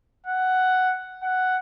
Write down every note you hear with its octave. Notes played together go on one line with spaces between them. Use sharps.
F#5
F#5